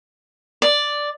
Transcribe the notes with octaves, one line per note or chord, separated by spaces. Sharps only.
D5